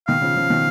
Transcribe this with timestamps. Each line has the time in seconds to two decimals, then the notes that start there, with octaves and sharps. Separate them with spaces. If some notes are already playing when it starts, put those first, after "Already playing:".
0.08 B2 D#3 F5
0.21 C#3 F3
0.36 C#3 F3
0.50 B2 D#3